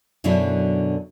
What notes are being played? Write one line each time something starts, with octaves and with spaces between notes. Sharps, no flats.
F#2 B2 D3 F#3 D4 E4